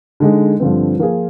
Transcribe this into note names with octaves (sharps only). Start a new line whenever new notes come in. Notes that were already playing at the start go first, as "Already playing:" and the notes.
D3 G#3 D#4 G#4
G2 D3 F3 C4
F3 A#3 F4 G#4